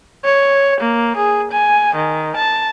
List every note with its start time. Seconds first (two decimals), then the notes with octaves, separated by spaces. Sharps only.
0.25 C#5
0.81 A#3
1.17 G#4
1.52 G#5
1.96 D#3
2.37 A5